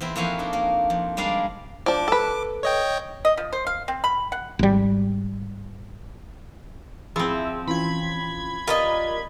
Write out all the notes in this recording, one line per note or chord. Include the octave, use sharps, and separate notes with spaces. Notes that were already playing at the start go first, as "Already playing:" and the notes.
E2 C4 E4
F2 A#3 E4 F#4 F5 G#5
D4 D#4
A#3
F2
G3 G#3 D4 A#4 F5
F3 D4 D6
A4 B4
C#5 D#5 G5
D#5
F3
C5
F5
C4
B5
F#5
G#1 G3
F3 C4 E4 G#4
E3 C#4 F4 B5 G#6
F4 G4 A#4 B4 D5 D#5